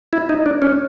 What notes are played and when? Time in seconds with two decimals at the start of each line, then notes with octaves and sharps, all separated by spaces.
0.13 E4
0.29 D#4
0.46 D4
0.62 C#4